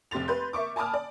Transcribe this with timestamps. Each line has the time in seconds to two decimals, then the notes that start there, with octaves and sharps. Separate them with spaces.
0.11 F1 C3 G4 C6 A6 F7
0.28 B4 C6 G6
0.53 A#4 E5 C#6 D6
0.76 G#5 A5 B5 D6 D#6 F6
0.94 D5